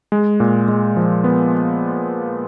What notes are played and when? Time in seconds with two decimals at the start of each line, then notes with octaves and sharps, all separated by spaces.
0.12 G#3
0.40 A#2
0.68 G#3
0.96 F3
1.24 B3